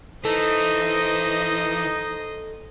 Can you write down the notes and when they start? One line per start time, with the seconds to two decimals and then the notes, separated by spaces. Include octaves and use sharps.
0.25 E3 D#4 A4 C5 D#5